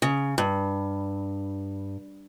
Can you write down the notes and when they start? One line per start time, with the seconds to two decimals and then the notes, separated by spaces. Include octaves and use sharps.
0.02 C#3
0.38 G2